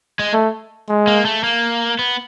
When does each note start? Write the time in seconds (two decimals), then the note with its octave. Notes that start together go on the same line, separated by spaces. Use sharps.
0.19 G#3
0.33 A3
0.89 G#3
1.07 A#3
1.25 A3
1.44 A#3
1.99 B3